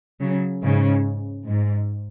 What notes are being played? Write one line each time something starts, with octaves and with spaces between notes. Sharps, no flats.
C#3 F#3
G#2 C#3
G#2